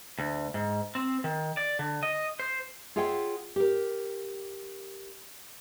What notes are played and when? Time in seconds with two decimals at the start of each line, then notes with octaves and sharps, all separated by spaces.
0.19 D2
0.54 G#2
0.95 C4
1.24 D#3
1.57 D5
1.79 D3
2.03 D#5
2.40 C5
2.96 F4 G#4 C#5 E5 F#5 G5
3.56 G4 A#4